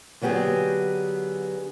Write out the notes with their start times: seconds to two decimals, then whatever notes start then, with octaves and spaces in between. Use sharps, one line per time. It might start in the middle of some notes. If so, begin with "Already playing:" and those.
0.21 D3 F#3 B3 G4 G#4